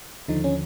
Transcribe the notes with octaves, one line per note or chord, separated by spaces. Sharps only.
D#2 D3 F3 D#4
C#4